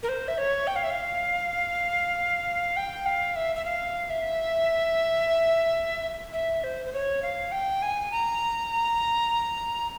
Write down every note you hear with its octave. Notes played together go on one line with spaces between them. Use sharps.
A#4
C5
E5
C#5
G5
F5
E5
F5
G5
F5
E5
E5
F5
E5
E5
C5
C5
C#5
F5
G5
G#5
A#5